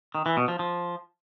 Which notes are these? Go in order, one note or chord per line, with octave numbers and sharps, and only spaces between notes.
D#3
E3
B2
F3
F3